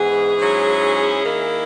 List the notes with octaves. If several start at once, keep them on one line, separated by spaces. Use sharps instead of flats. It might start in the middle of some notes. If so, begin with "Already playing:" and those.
Already playing: G#2 E3 B3 G#4
G#2 F#3 C#4 E4
D#3 A#3 E4